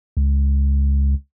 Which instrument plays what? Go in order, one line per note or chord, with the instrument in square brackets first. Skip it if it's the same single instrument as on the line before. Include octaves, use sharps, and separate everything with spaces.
[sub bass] C#2